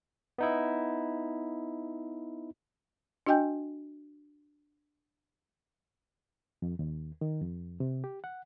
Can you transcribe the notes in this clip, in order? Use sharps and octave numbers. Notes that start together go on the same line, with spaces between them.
B3 D#4 E4
D4 F#4 D#5 G5 G#5 G6
F2
D#2
D#3
F2
C3
G4
F#5